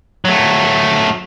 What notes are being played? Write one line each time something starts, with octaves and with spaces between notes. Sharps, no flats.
F#3 A3